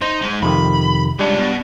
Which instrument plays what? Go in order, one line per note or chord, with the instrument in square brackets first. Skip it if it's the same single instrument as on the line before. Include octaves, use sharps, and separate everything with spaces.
[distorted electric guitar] D#4 [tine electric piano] C5
[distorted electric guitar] G#3 D#4
[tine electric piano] F2 C3 D#3 [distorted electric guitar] B5
[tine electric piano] G3 D4 [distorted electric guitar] G#3 F4
[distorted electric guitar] B2